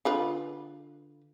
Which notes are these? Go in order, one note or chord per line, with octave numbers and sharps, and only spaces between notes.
D3 F4 B4